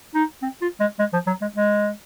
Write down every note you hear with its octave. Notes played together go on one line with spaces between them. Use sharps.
D#4
C4
F4
G#3
G#3
F3
F#3
G#3
G#3